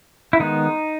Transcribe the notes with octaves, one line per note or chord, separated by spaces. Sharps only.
E4
D#3 G#3 B3 D#4